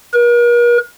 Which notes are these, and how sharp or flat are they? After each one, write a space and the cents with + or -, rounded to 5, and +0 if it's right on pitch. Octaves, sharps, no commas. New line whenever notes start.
A#4 +45